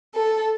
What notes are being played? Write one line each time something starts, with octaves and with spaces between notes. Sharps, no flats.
A4